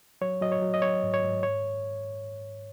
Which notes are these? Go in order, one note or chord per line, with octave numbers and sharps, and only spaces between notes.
F#3 C#5
F#3 D#5
C#5
F#3
D#5
F#3 C#5
G#2
C#5
G#2
C#5